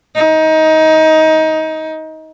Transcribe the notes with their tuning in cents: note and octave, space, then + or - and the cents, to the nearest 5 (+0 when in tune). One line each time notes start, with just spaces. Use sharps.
D#4 +20